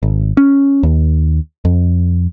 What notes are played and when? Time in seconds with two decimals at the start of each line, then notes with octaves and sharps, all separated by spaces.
0.03 G#1
0.37 C#4
0.83 D#2
1.65 F2